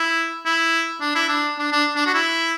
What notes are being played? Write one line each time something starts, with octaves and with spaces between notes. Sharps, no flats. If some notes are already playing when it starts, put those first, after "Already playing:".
Already playing: E4
E4
D4
E4
D4
D4
D4
D4
F#4
E4